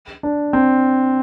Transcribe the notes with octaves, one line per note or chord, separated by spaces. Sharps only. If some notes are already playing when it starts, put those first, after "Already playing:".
D4
C4